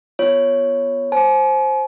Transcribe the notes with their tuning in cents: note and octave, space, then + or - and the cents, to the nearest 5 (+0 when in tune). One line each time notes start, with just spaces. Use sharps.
B3 +0 F4 +0 C#5 +0
C5 +10 G#5 +45